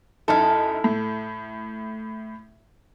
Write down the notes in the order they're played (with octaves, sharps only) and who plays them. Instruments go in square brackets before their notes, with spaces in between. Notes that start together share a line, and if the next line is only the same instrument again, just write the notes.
[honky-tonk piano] F#2 D#4 F6 [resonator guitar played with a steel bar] E4 A4
[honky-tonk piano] A2